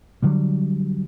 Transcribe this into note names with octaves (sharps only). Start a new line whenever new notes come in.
D3 F#3 G3